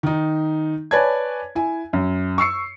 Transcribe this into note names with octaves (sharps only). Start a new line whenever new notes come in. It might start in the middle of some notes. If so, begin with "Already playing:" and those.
D#3 D#4
B4 C#5 D5 G#5 A5 G#6
E4 G#5
F#2
C#6 E6 C7 C#7